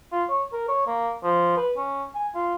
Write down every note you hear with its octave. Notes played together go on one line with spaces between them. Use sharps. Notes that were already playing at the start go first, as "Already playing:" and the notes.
F4
C#5
A#4
C#5
A#3
F3
B4
C#4
G#5
F4